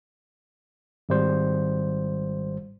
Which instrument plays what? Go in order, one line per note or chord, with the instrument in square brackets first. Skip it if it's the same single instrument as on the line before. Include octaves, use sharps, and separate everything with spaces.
[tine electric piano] G#1 G3 C5